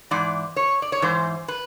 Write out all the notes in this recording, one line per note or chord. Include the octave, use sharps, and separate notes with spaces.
G#2 E3 D5
C#5
D5
C#5
G#2 E3 C5
B4